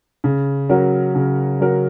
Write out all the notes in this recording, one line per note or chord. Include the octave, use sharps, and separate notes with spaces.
C#3
F#3 C#4 F#4 A#4
C#3
F#3 C#4 F#4 A#4